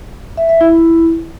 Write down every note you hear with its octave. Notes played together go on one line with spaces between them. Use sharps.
E5
E5
E4